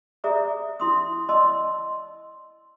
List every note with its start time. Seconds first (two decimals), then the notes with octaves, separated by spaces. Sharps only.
0.24 G#4 D5 E5 A#5 D#6
0.80 E4 C6 D#6
1.29 D5 D#5 A5 C6 E6